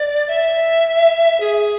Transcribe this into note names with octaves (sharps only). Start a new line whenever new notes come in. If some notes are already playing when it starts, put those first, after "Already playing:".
Already playing: D5
E5
G#4